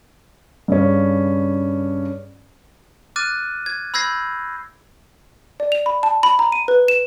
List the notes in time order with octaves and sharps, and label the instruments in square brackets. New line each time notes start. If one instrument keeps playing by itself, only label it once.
[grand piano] G2 C#3 C#4
[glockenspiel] D6 F6 F#6 A6 D#7
G#6
B5 E6 G6 G#6 A#6 C7
[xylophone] D5
F7
B5
A5
B5
A#5
D#7
B4
E7